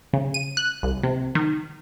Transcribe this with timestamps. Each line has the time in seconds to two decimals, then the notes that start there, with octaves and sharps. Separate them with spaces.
0.13 C#3
0.34 D#7
0.57 F#6
0.83 C2
1.03 C3
1.35 D#3